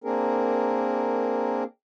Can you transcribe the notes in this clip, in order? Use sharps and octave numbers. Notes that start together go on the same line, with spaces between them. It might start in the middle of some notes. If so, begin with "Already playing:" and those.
A#3 C4 D4 G#4 A#4